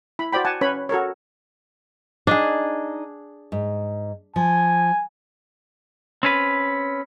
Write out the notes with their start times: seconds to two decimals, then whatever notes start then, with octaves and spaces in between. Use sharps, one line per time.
0.19 E4 B5
0.33 F#4 C5 D5 G5 B5
0.45 F#5 G#5 A5
0.61 C#4 B4 C#5 B5
0.89 F#4 A4 A#4 C#5
2.27 D4 D#4 G#4 D5 D#5
3.52 G#2
4.36 F3 G#5
6.23 C4 C#4 B4